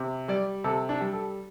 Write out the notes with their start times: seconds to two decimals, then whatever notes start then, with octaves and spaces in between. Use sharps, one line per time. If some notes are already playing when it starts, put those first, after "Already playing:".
Already playing: C3
0.28 G3 D5
0.64 C3 A4
0.89 D4
1.01 G3
1.13 A4